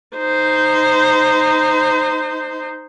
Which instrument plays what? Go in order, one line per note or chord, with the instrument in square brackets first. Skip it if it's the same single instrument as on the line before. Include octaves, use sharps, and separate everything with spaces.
[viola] D#4 C5